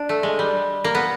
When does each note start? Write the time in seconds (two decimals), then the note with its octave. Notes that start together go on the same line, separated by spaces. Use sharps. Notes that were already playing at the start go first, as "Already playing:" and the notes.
Already playing: D4
0.09 A3
0.23 G#3
0.39 G3
0.84 A#3
0.95 B3